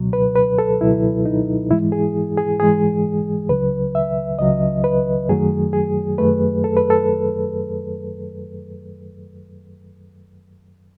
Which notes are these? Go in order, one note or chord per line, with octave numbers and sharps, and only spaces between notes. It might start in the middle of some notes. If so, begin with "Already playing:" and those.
Already playing: C#2 B2 F#3
B4
B4
A4
C#2 B2 F#3 E4
D#4
G#2 E3 G#3 E4
G#4
G#4
G#2 E3 G#3 G#4
C#2 C#3 F#3 B4
E5
C#2 C#3 F#3 D#5
B4
F#2 D#3 F#3 A3 G#4
G#4
F#2 D#3 F#3 A3 B4
A4
B4
A4